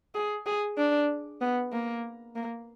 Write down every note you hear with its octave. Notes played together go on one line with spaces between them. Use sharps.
G#4
G#4
D4
B3
A#3
A#3